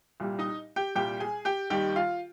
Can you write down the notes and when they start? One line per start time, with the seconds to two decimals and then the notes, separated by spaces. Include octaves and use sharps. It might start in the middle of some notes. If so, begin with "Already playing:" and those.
0.20 C2 A#2 G3
0.39 D#4 D#5
0.76 G4 G5
0.95 C2 A#2 G3 G4 G5
1.20 G#4 G#5
1.45 G4 G5
1.70 D#2 D#3 G3 G4 G5
1.96 F4 F5